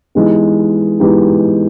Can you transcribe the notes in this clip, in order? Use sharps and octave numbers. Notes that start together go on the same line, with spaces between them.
E3 G#3 B3 D#4 G4
E3 G#3 B3 D#4 G4